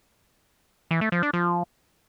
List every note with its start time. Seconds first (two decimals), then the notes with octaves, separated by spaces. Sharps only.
0.91 E3
1.01 A3
1.12 F3
1.23 D4
1.33 F3